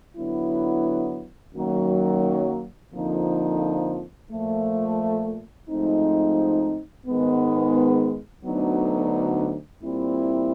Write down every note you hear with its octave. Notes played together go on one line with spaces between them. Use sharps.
D3 F#3 B3 E4
F#2 D#3 F#3 A#3
F2 D3 F3 A#3 D#4
A#2 F3 A3
G#2 F3 A3 C4 D#4
G#2 D#3 G#3 B3
D2 D3 F#3 B3 D#4
A#2 G3 C4 E4